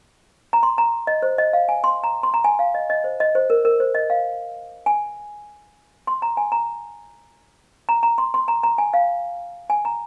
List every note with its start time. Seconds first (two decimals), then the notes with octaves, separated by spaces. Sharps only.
0.53 A#5
0.63 C6
0.78 A#5
1.07 D#5
1.22 C5
1.38 D#5
1.53 F5
1.69 G#5
1.84 C6
2.04 A#5
2.23 C6
2.34 A#5
2.44 G#5
2.59 F5
2.75 D#5
2.90 D#5
3.04 C5
3.20 D#5
3.35 C5
3.50 A#4
3.65 A#4
3.80 C5
3.95 D#5
4.10 F5
4.86 G#5
6.07 C6
6.22 A#5
6.37 G#5
6.52 A#5
7.89 A#5
8.03 A#5
8.18 C6
8.34 C6
8.48 A#5
8.63 A#5
8.78 G#5
8.94 F5
9.70 G#5
9.85 A#5